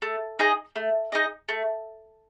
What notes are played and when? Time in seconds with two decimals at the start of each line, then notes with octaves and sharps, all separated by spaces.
0.02 A3
0.39 D#4 G#4 D#5
0.76 A3
1.12 D#4 G#4 D#5
1.49 A3